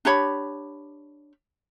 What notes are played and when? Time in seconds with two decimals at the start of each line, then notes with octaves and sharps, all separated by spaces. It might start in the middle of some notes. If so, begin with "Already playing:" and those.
0.05 D4 G4 C#5 B5